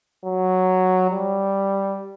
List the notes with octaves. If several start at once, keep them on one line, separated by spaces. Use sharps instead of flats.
F#3
G3